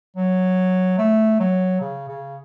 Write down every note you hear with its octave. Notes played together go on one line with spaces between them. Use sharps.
F#3
A3
F#3
C#3
C#3